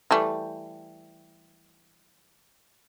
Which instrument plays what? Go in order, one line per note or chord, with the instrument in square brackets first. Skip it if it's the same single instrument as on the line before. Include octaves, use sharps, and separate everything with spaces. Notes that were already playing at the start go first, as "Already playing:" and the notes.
[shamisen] E3 G3 A3